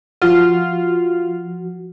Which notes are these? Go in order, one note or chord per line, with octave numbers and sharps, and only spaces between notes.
F3 F4 F#4